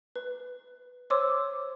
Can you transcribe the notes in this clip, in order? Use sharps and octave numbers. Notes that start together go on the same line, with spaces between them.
B4
C5 C#5 C6 D6 E6